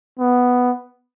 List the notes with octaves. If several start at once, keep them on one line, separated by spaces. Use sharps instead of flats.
B3